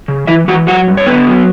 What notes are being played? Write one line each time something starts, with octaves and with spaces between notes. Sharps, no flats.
C#3
E3 E4 E5
E3 F#4 F#5
F#3 F#4 F#5
G2
C#5
D3 B3 B4
F#3